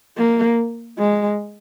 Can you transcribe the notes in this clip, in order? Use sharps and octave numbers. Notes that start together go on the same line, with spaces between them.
A#3
G#3